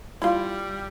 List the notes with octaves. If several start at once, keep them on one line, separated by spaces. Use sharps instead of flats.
G3 E4 F4